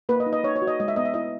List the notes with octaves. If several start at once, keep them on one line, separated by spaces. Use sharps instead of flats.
A#3 B4
D#5
D#4
D#5
D#4 C#5
C#5
F#4
D#5
G#3 D#5
E5
B3 D#5
E5
E4 D#5